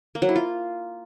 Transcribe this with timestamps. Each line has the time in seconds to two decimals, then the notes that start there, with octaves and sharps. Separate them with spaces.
0.15 A#3
0.22 F#3
0.29 E4
0.36 F4